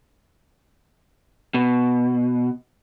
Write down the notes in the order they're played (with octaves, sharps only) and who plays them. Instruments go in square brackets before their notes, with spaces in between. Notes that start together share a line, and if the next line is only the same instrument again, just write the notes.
[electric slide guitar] B2